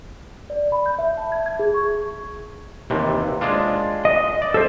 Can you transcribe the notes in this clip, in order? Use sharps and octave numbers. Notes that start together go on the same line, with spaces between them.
D5
B5
G6
E5
A5
G#6
G#6
G#4
C#6
D#2 C3 E3
G#3 D4 F4
D#5
D5
A4 C5 E5